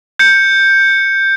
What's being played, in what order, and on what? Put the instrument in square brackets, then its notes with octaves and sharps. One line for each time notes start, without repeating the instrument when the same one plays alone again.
[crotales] G6 C#7